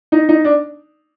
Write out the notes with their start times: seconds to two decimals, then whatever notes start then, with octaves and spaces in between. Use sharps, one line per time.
0.12 D#4
0.29 D#4
0.44 D4